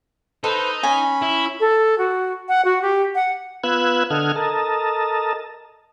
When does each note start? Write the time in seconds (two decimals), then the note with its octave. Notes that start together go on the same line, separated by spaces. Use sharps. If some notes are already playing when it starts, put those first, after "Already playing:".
0.44 D#4 A4 B4 C5
0.83 C#4 G#5 B5
1.22 E4
1.60 A4
1.98 F#4
2.49 F#5
2.65 F#4
2.82 G4
3.15 F#5
3.63 B3 F4 B4 E6 F#6 G#6
4.10 D3 A4 D#5 F#5 F6 G#6
4.36 A4 A#4 D#5 A5